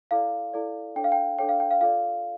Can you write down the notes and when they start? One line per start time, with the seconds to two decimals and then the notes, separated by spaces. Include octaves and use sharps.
0.11 E4 A4 D5 F5
0.54 E4 A4 D5
0.96 D4 A4 C#5 G5
1.04 F5
1.12 G5
1.39 D4 A4 C#5 G5
1.49 F5
1.60 G5
1.71 F5
1.81 F4 A4 D5 F5